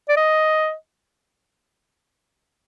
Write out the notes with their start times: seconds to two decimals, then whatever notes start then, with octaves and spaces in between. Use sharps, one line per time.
0.09 D5
0.17 D#5